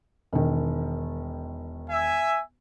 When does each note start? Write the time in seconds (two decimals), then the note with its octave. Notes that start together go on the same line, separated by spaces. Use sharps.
0.33 E1 D#3
1.88 E5 G#5